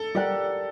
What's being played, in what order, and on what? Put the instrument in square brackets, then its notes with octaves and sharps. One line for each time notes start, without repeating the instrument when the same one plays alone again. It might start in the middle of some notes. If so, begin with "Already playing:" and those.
Already playing: [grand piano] A4
[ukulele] G4 A#4 D5 F#5